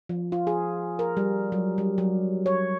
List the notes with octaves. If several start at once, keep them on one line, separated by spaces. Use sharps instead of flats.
F3
F4
G#4
A#4
G3
F#3
G3
F#3
C#5